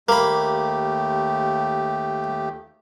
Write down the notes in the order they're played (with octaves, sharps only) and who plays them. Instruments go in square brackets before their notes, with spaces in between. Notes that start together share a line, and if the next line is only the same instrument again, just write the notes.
[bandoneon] D#2 A3 G4 [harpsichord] A#3 B5